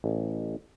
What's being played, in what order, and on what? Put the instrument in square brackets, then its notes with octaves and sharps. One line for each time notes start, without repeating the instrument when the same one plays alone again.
[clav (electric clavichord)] A1